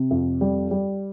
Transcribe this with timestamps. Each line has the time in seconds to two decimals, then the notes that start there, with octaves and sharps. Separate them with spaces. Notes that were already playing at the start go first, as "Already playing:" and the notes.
Already playing: C3
0.11 F2
0.41 G3
0.71 G3